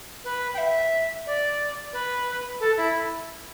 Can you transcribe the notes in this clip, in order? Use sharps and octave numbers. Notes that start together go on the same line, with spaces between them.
B4
G5
E5
D5
B4
A4
E4